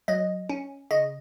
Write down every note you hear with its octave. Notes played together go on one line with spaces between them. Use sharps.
F#3 D#5
C#4
C#3 D#5